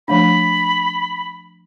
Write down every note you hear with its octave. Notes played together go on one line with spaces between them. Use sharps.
F3 A3 D4 B5